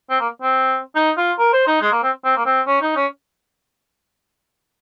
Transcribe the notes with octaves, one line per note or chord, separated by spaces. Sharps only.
C4
A#3
C4
D#4
F4
A#4
C5
D#4
G#3
A#3
C4
C4
A#3
C4
C#4
D#4
C#4